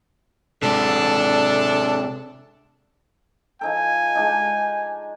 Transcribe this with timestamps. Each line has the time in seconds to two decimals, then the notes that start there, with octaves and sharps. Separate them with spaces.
0.63 C3 G#3 D4 A4
3.61 F3 D#4 A4 G#5
4.15 G#3 D4 D#4